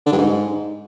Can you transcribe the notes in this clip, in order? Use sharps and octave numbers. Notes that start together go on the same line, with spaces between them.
D3
G2
G#2